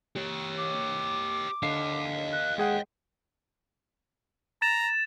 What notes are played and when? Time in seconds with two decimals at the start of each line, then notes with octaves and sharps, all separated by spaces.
0.16 G4 C#5
0.58 D6
1.63 D3 D#5 F5 C7
2.32 F#6
2.58 G#3 G#4 F#5 G5
4.62 A#5 A6 E7